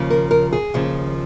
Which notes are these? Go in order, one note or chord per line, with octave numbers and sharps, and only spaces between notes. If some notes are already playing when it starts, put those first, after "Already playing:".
Already playing: D#2 C#3 F3
A#4
A#4
G#4
D#2 C#3 F3